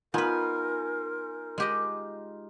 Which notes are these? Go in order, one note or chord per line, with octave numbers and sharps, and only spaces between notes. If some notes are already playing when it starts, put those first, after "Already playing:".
B3 D#4 F4 A#4 B4 G#5
G#3 G4 D#5